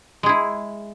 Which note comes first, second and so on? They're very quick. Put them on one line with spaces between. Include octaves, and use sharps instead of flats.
G#3 G#4 E4